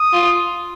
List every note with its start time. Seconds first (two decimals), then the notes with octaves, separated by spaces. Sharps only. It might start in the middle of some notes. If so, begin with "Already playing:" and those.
Already playing: D#6
0.13 F4